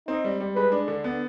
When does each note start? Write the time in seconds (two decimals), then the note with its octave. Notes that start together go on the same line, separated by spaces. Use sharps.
0.08 C4 D#4
0.24 G3
0.40 G3
0.56 G#3 B4
0.72 D4
0.88 D3
1.04 B3